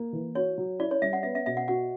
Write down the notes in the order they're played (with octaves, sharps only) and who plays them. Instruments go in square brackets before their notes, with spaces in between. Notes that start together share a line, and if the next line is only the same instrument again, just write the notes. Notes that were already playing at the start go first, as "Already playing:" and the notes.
Already playing: [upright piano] A#3
E3
[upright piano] F#4 [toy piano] C#5
[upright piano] F#3
[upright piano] E4 [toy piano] D5
[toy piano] C#5
[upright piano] G3 [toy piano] E5
[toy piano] F#5
[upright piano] B3 [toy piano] E5
[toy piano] E5
[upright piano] B2 [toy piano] E5
[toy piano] F#5
[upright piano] F#4 [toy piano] F#5